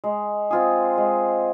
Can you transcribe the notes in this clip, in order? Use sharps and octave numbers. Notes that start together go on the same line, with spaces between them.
G#3
C4 F4 G#4
G#3